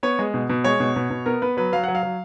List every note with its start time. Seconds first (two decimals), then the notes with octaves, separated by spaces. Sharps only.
0.03 B3 C#5
0.19 G#3
0.34 B2
0.50 B2
0.64 G#3 C#5
0.80 B2
0.96 B2
1.10 B2
1.26 B3 A#4
1.42 B3 B4
1.57 F#3 B4
1.72 F#3 F5
1.84 F#3 F#5
1.95 F5
2.03 F#3